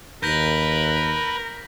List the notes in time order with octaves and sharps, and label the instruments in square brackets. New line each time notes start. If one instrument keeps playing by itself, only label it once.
[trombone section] D#2 [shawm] A#4 [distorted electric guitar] B4 [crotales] G6 A#6 B6